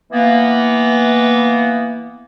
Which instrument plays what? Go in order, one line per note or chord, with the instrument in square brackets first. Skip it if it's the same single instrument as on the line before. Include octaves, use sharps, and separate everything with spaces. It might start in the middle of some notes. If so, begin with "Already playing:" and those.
[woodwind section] E3 A#3 B3